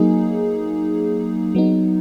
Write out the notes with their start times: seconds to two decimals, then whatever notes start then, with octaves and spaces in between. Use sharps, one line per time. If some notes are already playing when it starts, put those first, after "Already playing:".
Already playing: F#3 A#3 D#4 G#4
1.55 F#3 B3 D#4